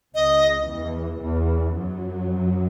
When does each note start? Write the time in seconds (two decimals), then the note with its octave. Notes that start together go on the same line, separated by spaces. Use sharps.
0.15 C#2 C#3 D#5
0.68 E2 E3
1.22 E2 E3
1.75 F#2 F#3